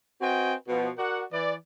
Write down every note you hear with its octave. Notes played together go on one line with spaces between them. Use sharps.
C4 F#4 B4 D#5 G5 G#5
B2 F3
F#4 A#4 D5 F#5
E3 D5